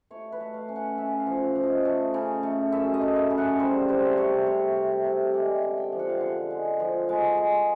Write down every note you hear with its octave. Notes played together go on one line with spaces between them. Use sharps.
A3 C#5
B4
A3
F5
C#4
F#5
C#4 E5
F5
F3
F3
D#5
A3
C#3
A3
F#2 E5
D#5
A3
E5
C#3
F#5
G3 C5
C3 C5
C3 C#5
C3 C#5
C3
C3
G#3 D5
G5
D3
G5
F3
F#5
F5
D3 F#5
G#3
F3
G#3
G#3